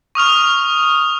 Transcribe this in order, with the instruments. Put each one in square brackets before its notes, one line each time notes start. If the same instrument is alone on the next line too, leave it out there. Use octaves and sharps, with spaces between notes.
[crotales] C#6 D#6 F6 F7